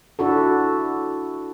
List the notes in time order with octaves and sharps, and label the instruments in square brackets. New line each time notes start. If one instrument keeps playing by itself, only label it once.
[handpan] D4 E4 F#4 A4